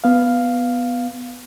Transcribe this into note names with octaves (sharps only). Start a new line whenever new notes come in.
B3 F5